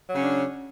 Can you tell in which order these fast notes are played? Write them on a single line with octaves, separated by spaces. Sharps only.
F#3 C#3 C#4 D4